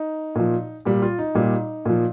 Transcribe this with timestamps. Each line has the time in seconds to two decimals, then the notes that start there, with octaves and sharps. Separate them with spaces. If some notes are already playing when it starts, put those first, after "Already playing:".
Already playing: D#4
0.35 A#2 F3
0.85 A#2 G3 G4
1.02 F4
1.19 D#4
1.35 A#2 G3
1.85 A#2 F3